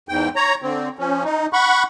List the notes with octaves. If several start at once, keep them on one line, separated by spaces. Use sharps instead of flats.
E2 G#2 G5
C#5 A#5
D3 C4
F3 C#4
D#4
F#5 B5 C#6